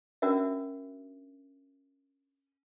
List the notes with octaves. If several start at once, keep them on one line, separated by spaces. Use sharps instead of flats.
C#4 D4 F#4 A#4 E5